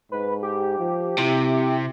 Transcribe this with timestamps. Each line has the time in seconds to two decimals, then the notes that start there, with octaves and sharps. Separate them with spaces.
0.12 G#2 B4
0.43 G4
0.79 F3
1.18 C3 E4